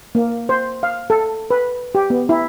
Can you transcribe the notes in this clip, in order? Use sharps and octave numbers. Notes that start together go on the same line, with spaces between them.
A#3
C5
F5
A4
B4
G4
B3
E4